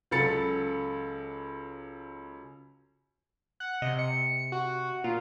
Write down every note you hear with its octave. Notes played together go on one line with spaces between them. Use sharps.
C#2 F#3 A4 B5 A6 C#7
F#5
C3 D#5
C#7
F#4
A#2 F4